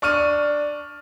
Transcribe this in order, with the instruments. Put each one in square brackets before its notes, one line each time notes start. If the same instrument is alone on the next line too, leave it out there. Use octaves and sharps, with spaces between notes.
[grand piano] D4 C#6 F6 D#7